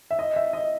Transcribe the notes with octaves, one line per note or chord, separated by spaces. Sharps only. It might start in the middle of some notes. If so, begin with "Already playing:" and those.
E5
D#5
E5
D#5